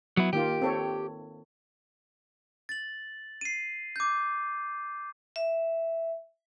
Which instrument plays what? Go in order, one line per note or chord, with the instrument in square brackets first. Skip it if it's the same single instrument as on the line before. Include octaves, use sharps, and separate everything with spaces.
[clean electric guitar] F#3 B3 E4
[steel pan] D#3 A#3 F4 [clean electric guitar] G4
[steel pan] C4 A4 C#5
[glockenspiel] A6 F#7
C7 D#7
D6 G6
[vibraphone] E5